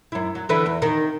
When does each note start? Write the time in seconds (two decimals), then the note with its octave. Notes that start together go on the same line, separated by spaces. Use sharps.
0.12 F#2 E4
0.35 F#3
0.49 D3 E3 B4
0.66 E2
0.82 D#3